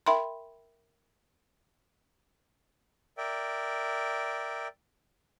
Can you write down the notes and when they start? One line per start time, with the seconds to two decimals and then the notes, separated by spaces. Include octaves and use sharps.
0.06 A#4 E5 G5 B5 C6
3.18 A#4 D5 E5 G5